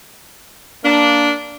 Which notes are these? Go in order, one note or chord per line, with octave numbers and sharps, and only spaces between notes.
A#3 D4